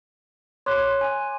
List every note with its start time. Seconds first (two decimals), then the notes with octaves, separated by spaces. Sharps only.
0.66 C#5 C6 D6 F#6
1.01 G#5